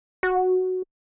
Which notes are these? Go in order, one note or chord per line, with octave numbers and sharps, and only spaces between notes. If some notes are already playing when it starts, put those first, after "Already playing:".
F#4